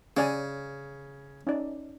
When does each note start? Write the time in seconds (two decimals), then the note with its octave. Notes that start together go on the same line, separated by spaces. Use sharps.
0.17 C#3 C#4 D5 G#5
1.47 C#4 D#4 D5